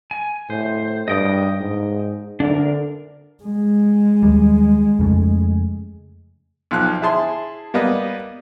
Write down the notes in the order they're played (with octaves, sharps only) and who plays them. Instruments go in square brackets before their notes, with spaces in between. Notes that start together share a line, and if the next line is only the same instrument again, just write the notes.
[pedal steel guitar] G#5
[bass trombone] A2 [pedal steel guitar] C5
[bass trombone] G2 [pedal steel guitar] D#5 G5 D#6
[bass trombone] G#2
[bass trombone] D3 [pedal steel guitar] D4 A#4
[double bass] G#3
[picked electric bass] D#2 G3
F2 C#3 A3
[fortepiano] B1 F3 F5 F#6
E4 G#4 A5 C6
G3 A#3 B3 D#5